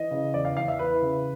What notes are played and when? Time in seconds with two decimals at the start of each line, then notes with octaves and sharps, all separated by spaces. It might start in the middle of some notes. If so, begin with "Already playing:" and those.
Already playing: E3 D#5
0.11 C#3
0.34 E2 D5
0.45 F5
0.57 E2 F5
0.68 E5
0.79 E3 B4
1.02 C#3